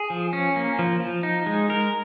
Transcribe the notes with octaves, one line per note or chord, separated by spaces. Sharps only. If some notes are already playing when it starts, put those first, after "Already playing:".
Already playing: G#4
F3
C#4
A#3
F3
F3
D#4
G#3
A#4